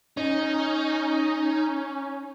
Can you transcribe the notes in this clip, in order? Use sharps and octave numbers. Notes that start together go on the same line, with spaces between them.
C#4 D#4